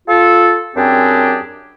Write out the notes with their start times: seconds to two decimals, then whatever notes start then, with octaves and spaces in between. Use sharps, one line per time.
0.08 F4 A4
0.76 F#2 C4 D4 G4 G#4